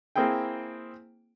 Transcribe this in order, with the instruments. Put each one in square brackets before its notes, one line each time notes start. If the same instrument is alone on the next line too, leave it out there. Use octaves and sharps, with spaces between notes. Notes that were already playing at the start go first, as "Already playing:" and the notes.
[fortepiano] A#3 C4 E4 G#4 G5